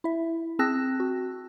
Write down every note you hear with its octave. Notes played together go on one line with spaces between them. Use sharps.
E4 E5
C4 G#4 A5 E6 F#6 A#6
F#4